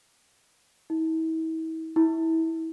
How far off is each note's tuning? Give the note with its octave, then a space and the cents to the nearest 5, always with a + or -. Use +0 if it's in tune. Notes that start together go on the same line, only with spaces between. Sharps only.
E4 -40
E4 -25